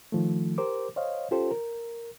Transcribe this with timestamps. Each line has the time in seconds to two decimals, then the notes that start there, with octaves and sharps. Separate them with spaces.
0.12 D#3 F3 A3
0.58 G4 A#4 C5 D6
0.96 C5 C#5 D#5 F5
1.31 C#4 F4 G4 A4 C5
1.51 A#4